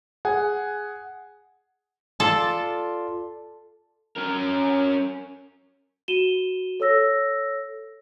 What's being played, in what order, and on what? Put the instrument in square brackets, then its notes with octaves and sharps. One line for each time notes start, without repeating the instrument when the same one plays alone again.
[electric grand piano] G#4 F#5 G#5
[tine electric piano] F4 D5 C6 [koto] A4
[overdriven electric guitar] C#4 A#4
[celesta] F#4 D#7 E7 G7
A4 C#5 E6 A#6